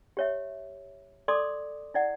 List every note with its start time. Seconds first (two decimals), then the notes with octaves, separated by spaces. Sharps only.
0.17 G4 C#5 E5
1.28 A4 D5 C6 D6 D#6
1.94 E4 D5 F#5